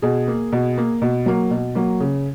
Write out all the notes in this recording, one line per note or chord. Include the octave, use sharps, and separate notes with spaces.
B2 G#4
A#3
B2
A#3
B2
F#3 A#3
B2
F#3 A#3
C#3